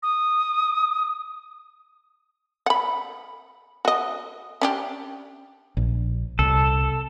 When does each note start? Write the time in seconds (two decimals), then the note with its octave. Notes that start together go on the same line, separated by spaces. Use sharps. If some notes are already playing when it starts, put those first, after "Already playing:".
0.03 D#6
2.66 F#5 B5
3.85 F#4 D#5
4.61 C#4 D4 G4
5.77 A#1
6.39 C2 A4